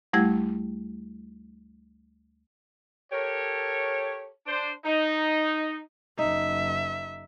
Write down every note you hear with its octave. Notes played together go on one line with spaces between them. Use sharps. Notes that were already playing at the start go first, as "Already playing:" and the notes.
D2 G3 A3 E4 G4 G#6
G4 A4 A#4 C#5
D4 C5
D#4
F#1 D#4 E5